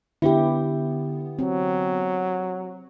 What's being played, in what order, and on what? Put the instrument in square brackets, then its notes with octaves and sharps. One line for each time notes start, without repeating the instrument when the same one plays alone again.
[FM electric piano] D3 B3 [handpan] E4 G4
[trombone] F#3 [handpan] C4